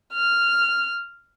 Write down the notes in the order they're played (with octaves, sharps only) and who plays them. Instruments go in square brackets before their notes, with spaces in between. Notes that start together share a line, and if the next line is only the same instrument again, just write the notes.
[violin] F6